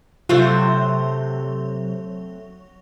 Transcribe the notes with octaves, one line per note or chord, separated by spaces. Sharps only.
C3 F#3 A3 C4 F4 C5